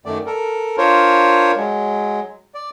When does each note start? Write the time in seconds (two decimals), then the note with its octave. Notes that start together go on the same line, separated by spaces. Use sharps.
0.06 F#2 D#3 A3 D5
0.26 A4 A#4
0.78 D4 F4 A#4 C5 C#5
1.56 F#3 G#3
2.55 D5